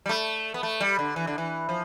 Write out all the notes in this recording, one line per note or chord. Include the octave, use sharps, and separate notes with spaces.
G3
A3
B3
A3
G3
D3
E3
D3
E3
F3